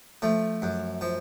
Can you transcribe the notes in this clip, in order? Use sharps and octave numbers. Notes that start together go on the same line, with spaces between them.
F3 A3
F#2
F3